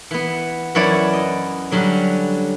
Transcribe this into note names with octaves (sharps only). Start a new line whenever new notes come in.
E3 B3
F#2 E3 E4 C#5 D5
D#5
D3 F#3 G3 C#4